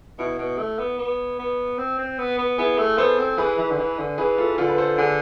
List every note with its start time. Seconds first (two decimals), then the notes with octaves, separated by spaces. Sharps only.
0.19 B2 E4
0.38 B2
0.58 A3
0.79 B3
0.98 B3
1.39 B3
1.78 C4
1.99 C4
2.18 B3
2.38 B3
2.58 B3 E4 G#4
2.78 A3
2.98 B3 A4 C5
3.18 C4
3.38 E3 G#4 B4
3.58 E3
3.71 D3
3.78 E3
3.99 D3
4.18 E3 G#4 B4
4.38 F4 A4
4.58 D3 F4 A4
4.69 B4
4.78 A4 C5
4.97 D3 G#4 B4